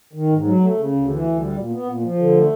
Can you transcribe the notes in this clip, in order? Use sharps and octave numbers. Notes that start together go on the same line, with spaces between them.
D#3
G#2
F#3
A3
C#3
D2
E3
D2
G3
A#2
B3
A#2
F3
D3
A3